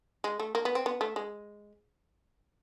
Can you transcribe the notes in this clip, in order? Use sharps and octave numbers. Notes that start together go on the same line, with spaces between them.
G#3
A3
A#3
B3
C4
B3
A3
G#3